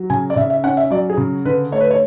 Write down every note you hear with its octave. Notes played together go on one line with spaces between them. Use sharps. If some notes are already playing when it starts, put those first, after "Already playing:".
Already playing: F#3
C#3 G#5
D5
C#3 E5
E5
C#4 F#5
E5
F#3 D5
G#4
C#3
D3 B4
A3 C#5
B4
C#5